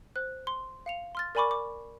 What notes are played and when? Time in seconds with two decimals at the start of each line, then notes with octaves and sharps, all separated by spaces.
0.16 C5 F#6
0.47 C6
0.86 F5 C#7 F7
1.15 C6 F6 A6
1.35 A#4 D5 G#5 B5 C#6 D6
1.51 D6